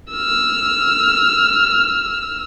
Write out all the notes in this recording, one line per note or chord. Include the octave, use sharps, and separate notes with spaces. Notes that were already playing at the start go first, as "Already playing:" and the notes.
E6 F6